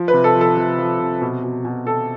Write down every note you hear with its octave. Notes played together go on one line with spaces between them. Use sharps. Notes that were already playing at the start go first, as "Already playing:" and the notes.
Already playing: F3
B4
C3
A4
F3
A4
C3
F3
C3
B2
B2
B2
B2 A4